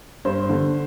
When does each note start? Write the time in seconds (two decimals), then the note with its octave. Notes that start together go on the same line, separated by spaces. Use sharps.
0.25 G2 C5
0.49 D3